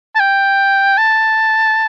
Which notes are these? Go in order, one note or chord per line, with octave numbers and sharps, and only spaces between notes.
A5
G5
A5